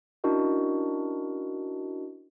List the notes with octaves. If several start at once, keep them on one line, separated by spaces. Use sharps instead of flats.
C#4 D4 E4 F#4 A#4 D#5